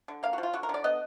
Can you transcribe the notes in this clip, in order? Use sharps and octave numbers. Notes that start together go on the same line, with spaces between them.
D3
A#3 F5
F3 F#4
F4
D3 F#4
A#4
D3
D5
B3 D#5